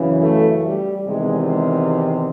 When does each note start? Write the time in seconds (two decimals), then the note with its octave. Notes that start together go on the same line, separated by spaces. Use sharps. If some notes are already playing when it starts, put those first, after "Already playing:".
Already playing: F#2 C#3 E3
0.21 A3
0.64 G3
1.07 E2 C3 D#3 G#3